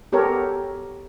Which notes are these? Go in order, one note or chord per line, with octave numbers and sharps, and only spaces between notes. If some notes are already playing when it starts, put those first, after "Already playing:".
B3 G4 A4 A#4 C#5